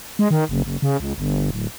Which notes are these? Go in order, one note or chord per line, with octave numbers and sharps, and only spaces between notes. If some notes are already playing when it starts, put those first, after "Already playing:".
G#3
D#3
F#1
F#1
C#3
C#2
G1
D1